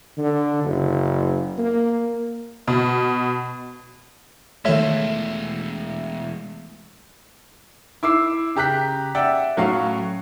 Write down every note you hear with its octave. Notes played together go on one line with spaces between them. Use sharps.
D3
F#1
A#3
B2
E2 D#3 G#3 A3 F4 C#5 E5
E4 D6 E6 C7
C#3 G4 A#5 F#6 B6
D5 E5 F#5 G5 E6
A2 F#3 C#4 F#4 F5 C#6